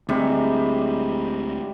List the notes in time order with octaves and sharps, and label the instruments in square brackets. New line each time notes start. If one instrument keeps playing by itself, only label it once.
[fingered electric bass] D2 C4 [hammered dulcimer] G#2 C3 G3